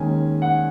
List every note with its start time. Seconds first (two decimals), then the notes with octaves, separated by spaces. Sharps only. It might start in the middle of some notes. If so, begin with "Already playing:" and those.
Already playing: D#2 D#3 G#3 C#4 G#5
0.42 F#5